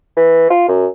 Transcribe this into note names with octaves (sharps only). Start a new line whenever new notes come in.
E3
F4
F#2